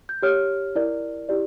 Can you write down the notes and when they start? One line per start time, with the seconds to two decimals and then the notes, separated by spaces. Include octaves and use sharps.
0.09 G6
0.22 G4 C#5 F6
0.75 E4 A#4 D5
1.29 E4 G4 D5